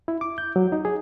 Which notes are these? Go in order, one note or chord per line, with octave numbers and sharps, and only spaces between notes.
E4
D6
G6
F#3
D#4
G#4